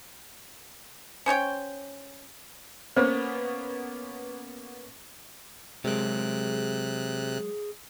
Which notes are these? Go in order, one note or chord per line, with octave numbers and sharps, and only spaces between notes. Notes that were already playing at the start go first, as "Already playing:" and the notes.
C#4 C5 C#5 G5
A#3 B3 C#4 C5
C3 F#3 G#3 G#4 A#4 F#6